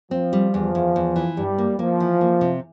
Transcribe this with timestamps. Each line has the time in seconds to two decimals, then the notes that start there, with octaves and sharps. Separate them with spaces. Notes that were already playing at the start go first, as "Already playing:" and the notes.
0.11 F3 C4
0.33 G3
0.54 E2 F3
0.75 E2
0.96 E2
1.16 E3
1.37 G2 G3
1.58 A#3
1.79 F3 A#3
2.00 E3
2.21 A#3
2.41 C3